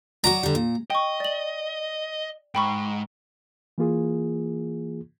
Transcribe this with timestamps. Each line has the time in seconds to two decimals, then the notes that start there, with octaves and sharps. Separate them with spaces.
0.24 F#3 F#4 D5 A#5
0.43 D3 G3
0.55 A#2
0.90 D#5 G5 C#6
1.20 D5 F#7
2.55 G#2 G5 B5 C#6
3.78 E3 A#3 F4 G#4